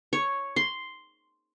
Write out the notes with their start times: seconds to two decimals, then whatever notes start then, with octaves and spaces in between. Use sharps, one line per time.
0.13 C#5
0.56 C6